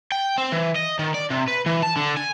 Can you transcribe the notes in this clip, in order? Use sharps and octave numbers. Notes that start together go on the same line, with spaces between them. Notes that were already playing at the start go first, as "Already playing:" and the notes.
G5
C4
E3
D#5
D#3
D5
C3
B4
E3
A5
D3
G#5